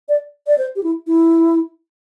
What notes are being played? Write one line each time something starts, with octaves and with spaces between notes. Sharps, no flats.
D5
D5
C5
G4
E4
E4